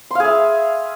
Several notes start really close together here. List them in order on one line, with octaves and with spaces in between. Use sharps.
C6 F5 G#4 E5